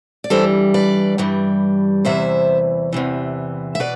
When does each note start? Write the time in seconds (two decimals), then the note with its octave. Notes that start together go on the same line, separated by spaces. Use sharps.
0.24 D5
0.30 G2 E3 G3 A4 C5
0.74 B4 D5
1.18 G2 E3 G3
2.05 E2 C3 E3 C5 E5
2.93 E2 C3 E3
3.75 E5
3.80 B2 B4 D5